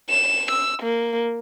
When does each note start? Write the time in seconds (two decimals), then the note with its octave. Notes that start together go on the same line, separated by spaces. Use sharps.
0.10 E7
0.51 E6
0.82 A#3